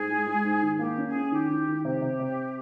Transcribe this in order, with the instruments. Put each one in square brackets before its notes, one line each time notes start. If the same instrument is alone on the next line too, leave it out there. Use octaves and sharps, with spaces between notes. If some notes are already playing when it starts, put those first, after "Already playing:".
Already playing: [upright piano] G#2 [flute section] G#4
[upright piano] G#3
G#3
G#2
D#3
[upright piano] A#3 [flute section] G4
[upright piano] C#4
[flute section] G#4
[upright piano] C#4
[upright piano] D#3 [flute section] G4
[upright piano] D#3
D#3
[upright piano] C3 [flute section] G4
[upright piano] C3
C3